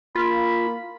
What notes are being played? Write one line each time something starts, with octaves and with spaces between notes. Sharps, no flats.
A#3 F4 B5